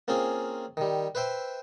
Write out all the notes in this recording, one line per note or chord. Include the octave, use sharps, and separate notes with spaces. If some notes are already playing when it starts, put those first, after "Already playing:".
A#3 C4 C#4 F4 G#4
D#3 G3
B4 C5 E5 G5